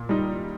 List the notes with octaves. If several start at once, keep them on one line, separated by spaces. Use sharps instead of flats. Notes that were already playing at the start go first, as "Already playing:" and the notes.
Already playing: A#2
G3 D#4